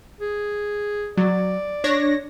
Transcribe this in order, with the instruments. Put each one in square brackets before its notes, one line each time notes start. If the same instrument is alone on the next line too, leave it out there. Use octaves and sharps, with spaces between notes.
[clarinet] G#4
[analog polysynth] F#3 [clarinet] D5
[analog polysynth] D4 C#5 A#6